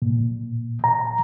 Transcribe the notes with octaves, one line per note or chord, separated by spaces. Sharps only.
A#2
A#5